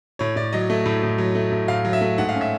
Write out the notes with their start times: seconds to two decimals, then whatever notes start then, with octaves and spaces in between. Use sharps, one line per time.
0.19 A2 C#5
0.36 A2 D5
0.53 F#3 D#5
0.70 A3
0.86 A2
1.03 A2
1.18 F#3
1.35 A3
1.52 A2
1.68 A2 F5
1.85 F#3
1.93 E5
2.01 A3
2.18 G#2 F#5
2.29 F5
2.35 C#4
2.41 E5